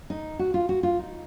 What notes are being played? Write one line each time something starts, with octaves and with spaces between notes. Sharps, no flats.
D#4
F#4
F4
F#4
F4
D#4